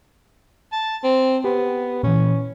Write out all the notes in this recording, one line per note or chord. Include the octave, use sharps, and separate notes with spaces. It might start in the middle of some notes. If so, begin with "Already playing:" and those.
A5
C4
B3 G4
A#2 E3 C#4